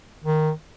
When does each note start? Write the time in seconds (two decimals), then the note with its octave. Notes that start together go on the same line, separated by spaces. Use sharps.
0.24 D#3